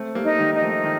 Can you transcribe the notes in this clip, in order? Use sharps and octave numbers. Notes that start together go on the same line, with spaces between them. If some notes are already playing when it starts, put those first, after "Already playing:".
Already playing: A3 C4
G3 A#3
D#4
D#3 G3
D#4
F3 A3
D#3